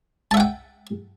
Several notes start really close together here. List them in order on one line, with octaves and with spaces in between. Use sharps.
A5 E5 F#5 G5